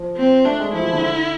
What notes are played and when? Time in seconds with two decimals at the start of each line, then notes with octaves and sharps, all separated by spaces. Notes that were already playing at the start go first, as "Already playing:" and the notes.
Already playing: F3
0.17 C4
0.45 A3 D4
0.60 G#3
0.74 F3 E4
0.84 F3
0.93 D3